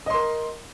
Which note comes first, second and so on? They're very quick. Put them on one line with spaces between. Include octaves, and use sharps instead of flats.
D#5 C6 A#4